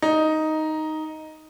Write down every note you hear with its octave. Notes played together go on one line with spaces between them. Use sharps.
D#4